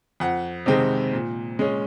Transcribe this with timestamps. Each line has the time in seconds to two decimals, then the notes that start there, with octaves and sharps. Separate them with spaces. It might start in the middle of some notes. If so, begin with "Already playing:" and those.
0.20 F2 F#5
0.66 C3 D#3 G#3 C4
1.13 A#2
1.59 G#3 C#4